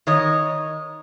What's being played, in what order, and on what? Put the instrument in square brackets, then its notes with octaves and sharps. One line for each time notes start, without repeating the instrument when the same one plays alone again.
[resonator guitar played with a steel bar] D#3 C#5 D#5